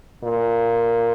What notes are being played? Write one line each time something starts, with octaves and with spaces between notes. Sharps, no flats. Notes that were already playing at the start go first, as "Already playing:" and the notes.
A#2